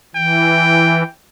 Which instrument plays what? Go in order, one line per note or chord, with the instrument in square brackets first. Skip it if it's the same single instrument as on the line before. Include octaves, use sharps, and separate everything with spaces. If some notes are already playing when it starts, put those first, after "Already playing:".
[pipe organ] E3 [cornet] G5